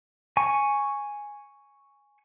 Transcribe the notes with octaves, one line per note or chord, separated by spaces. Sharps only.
G#5 C#6